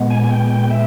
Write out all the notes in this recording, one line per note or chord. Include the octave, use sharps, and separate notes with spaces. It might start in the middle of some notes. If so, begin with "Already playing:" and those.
Already playing: A#2 G#3 B3
G#5
G#5
G5
G5
E5